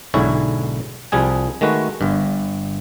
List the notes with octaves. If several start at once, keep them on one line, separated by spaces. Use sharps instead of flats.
B1 G#2 D3 E4 C#5 G#5
C2 F3 G3 G#4 G#5
D#3 G#3 A3 F#4 B4
G1 G2